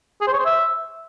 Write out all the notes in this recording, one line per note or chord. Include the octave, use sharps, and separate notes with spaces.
G#4
C5
C#5
C5
E5